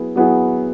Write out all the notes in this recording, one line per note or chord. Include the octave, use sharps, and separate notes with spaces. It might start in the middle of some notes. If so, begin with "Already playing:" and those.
Already playing: F#3 B3 E4 G#4
F#3 B3 E4 G#4